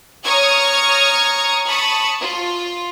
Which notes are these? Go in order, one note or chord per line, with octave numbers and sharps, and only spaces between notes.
C#5 A#5 C#6 D#6 F6 G#6
A5 B5 C#6 D#6
F4